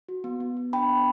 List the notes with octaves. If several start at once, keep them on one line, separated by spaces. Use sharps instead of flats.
F#4
B3
B3
B3
D4 G5 B5
B3